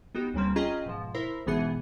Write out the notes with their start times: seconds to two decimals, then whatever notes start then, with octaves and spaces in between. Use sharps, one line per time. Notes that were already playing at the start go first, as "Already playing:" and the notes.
0.15 B3 D#4 F#4 G4
0.34 D2 C#3 G3 A#3 C4
0.56 C#4 F4 G#4 D#5 G5 A#5
0.86 G#2 B2 F3
1.14 E4 A#4 C5 B5
1.46 G#1 B2 E3 B3 G#4 C#7